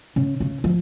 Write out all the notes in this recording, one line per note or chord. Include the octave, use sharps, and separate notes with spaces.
C#3
C#3
F3